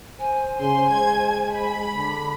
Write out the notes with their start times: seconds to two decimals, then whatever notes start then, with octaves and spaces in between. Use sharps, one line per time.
0.19 C5 G#5
0.60 C#3 G#5 C6
0.90 G#3 G#6
1.53 B5
1.94 D3